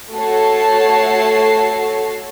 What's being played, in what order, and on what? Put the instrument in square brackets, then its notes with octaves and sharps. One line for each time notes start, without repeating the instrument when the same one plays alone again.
[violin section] A3 F#4 A4 C#5 A5 C7